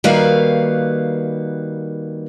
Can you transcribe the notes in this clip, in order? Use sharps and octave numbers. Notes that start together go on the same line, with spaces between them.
D#3 G3 A#3 F#4 B4 F5